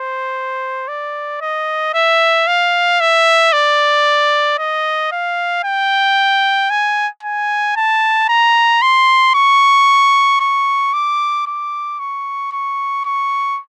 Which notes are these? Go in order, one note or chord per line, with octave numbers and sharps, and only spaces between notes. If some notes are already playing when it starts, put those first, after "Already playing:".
Already playing: C5
D5
D#5
E5
F5
E5
D5
D#5
F5
G5
G#5
G#5
A5
A#5
C6
C#6
C#6
D6
D6
C#6
C#6
C#6